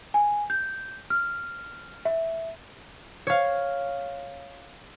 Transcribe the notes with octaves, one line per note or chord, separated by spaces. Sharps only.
G#5
G6
F6
E5
C#5 F5